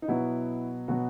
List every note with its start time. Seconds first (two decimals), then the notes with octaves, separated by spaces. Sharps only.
0.02 D#4
0.08 B2 F#3 B3 E4
0.88 B2 F#3 B3 F#4